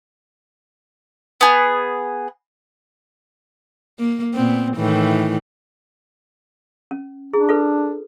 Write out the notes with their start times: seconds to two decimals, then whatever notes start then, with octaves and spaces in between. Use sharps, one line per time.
1.41 B3 G#4
3.99 A#3
4.34 A#2 B3 C4
4.77 A2 D#3 E3
6.91 C#4
7.33 D4 E4 G#4
7.49 F4 A4 B4